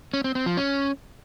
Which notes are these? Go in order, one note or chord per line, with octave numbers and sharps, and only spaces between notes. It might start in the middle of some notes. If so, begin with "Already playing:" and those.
C#4
C4
C4
F3
C#4